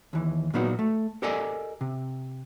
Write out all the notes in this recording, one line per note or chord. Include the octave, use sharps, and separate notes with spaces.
D#2 E3
A#2 F#3 A#3 B3 D#4 F#4
A3
G4 A4 A#4 D5 D#5 G#5
C3